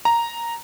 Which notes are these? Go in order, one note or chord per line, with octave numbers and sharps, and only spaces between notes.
A#5